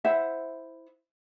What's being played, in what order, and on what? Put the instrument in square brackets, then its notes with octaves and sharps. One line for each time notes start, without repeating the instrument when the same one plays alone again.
[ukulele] E4 C5 E5 F#5